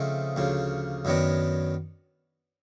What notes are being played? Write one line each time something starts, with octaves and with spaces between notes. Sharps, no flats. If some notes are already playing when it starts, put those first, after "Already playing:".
Already playing: C#3 F3 A3 C4 D#4
D2 C#3 F3
F#2 D#3 F#3 B3 D4